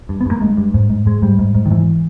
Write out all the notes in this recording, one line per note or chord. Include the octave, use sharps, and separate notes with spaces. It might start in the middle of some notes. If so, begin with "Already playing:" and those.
G2
B3
G2
A#3
G2 G#3
G2
G#2
G#2
G#2 G#3
G#2 G3
G#2
G#2
D#3
G#2 E3